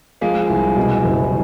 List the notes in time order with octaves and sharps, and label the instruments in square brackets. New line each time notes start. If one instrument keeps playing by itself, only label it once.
[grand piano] F3 [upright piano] G#3 A#3
[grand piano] C2
B2
F#1